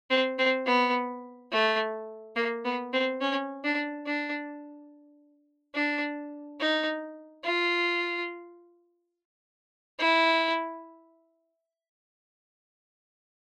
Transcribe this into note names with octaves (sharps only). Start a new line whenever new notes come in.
C4
C4
B3
A3
A#3
B3
C4
C#4
D4
D4
D4
D#4
F4
E4